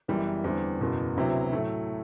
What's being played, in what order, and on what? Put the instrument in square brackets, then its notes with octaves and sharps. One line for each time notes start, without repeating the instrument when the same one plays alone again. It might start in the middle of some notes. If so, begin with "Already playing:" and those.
[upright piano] F#1 F#2 E3 G3 B3
E2 D3 G3 C4
F#1 E2 B2
D2 C3 F#3 B3 E4
A2 F#3 A3